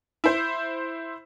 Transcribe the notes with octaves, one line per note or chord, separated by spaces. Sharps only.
E4 C5